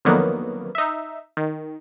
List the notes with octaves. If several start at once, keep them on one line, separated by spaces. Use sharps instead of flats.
F2 D3 D#3 F#3 A#3 B3
D#4 E5
D#3